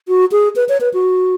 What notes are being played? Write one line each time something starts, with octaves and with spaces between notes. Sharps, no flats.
F#4
G#4
B4
C#5
B4
F#4